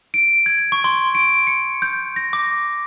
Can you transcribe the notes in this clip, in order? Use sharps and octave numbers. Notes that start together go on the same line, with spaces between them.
D7
G#6
C#6
C6
D7
C#7
G6
A#6
D6